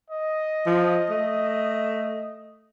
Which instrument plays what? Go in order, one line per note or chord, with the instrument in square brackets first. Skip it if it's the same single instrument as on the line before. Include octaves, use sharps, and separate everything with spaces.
[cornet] D#5
[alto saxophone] F3
A3